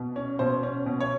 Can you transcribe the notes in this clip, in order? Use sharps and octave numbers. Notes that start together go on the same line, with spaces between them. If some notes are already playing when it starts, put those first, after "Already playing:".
Already playing: B2
C#4
B2 C5
C#4
B2
C#5